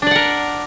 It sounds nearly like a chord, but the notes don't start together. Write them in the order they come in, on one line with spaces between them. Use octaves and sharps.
D4 D5 F#5 A#4